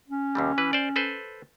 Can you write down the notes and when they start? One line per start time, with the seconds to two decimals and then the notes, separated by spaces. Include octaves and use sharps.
0.08 C#4
0.35 D#2 C3 G3
0.58 E3 B4
0.73 C5 D5
0.96 A4 B4 C5